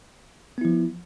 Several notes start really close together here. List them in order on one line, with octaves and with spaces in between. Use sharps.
B3 E4 F3